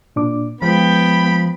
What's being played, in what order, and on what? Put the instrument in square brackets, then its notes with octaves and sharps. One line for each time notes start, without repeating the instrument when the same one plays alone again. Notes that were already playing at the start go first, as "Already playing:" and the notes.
[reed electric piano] A#2 D4 D6
[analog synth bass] F3 [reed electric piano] G#3 [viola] B3 G5 [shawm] B5